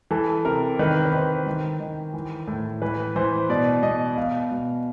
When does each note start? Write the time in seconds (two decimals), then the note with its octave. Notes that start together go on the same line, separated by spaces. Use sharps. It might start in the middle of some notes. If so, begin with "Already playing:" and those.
0.11 E3 A4
0.45 C3 A#4
0.79 D#3 B4
1.05 B4
1.13 D#3 C5
1.46 D#3
1.80 D#3
2.14 E3
2.47 A2
2.82 E3 B4
3.16 E3 C5
3.49 B2 D5
3.83 B2 D#5
4.17 B2 F5
4.52 B2